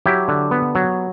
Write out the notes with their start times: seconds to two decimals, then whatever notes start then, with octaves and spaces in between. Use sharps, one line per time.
0.06 F#3 E4 G4
0.28 D3
0.51 B3
0.75 F#3